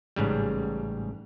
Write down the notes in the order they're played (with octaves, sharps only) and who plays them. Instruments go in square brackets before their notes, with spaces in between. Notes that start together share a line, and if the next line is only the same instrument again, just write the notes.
[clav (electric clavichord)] A1 G#2 C#3 G3